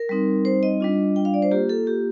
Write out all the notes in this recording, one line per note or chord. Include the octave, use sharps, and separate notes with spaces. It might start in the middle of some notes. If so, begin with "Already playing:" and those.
Already playing: A#4
G3 C4 D#4
C5
D#5
G3 D4 F4
G5
F5
D5
C5
A#3 F4 G4
A4
G4